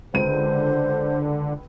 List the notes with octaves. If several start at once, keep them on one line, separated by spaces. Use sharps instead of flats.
C#2 D3 C5 D#7